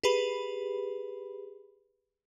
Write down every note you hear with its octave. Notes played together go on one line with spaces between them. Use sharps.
G4 G#4 B4 B5